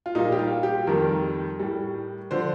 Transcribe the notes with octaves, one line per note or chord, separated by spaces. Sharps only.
F4
A#2 G3 D#4
G4
F4
G4
F2 D#3 G3 A#4
A2 G3
D3 F3 C5